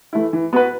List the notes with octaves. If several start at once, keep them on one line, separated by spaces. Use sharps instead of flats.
E3 A3 E4
E3
B3 F#4 B4